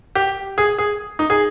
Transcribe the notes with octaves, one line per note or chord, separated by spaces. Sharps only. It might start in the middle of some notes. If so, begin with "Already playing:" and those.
G4
G#4
G#4
D#4
G#4